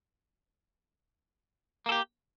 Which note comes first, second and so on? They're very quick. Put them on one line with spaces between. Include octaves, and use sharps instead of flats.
A#3 A4 G4